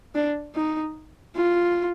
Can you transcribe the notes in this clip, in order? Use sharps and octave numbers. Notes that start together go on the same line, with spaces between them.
D4
D#4
F4